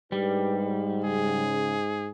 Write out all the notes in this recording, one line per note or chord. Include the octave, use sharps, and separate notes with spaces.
G#2 G3 D4 G4 B4
C#3 G#4